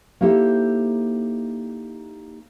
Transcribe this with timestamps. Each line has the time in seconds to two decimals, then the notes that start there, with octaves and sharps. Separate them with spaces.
0.21 A#3 D#4 E4 G4 A4 C5